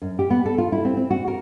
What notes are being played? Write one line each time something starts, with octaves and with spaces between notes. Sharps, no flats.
F#2
G4
B3
A4
F4
E4
C4
C4
F#4
A#4